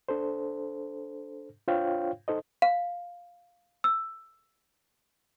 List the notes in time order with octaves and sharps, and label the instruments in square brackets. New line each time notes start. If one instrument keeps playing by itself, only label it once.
[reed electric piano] D4 A4 C5
D4 F4 C5 C#5 F5 G5
D#4 A4 C5 D#5
[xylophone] F5
E6